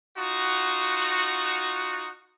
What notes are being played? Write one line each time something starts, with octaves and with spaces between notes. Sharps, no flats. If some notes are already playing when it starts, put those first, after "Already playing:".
D#4 F4 F#4